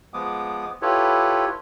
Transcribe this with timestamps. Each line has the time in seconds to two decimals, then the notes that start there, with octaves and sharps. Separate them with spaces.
0.14 F3 G#3 B3 D6 D#6
0.82 E4 F4 G4 A4 B4 C#5